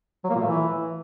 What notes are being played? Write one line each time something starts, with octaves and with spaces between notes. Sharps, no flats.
F#3
A#3
A#2
A3
E3